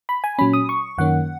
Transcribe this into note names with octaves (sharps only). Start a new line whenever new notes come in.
B5
G#5
A#2 F#3 C#4 B5
D#6
C#6
F#2 D#3 A#3 C#4 F#5